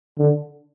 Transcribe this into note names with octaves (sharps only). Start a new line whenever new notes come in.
D3